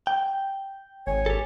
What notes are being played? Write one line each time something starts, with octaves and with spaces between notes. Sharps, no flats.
G5
G#1 C#5 G#5
G4 A4